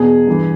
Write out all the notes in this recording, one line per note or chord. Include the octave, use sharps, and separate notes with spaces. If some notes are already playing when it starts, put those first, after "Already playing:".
Already playing: E2 B2 G#4
G2 E3